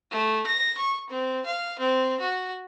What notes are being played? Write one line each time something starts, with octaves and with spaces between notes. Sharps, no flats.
A3
A#6
C#6
C4
F5
C4
F#4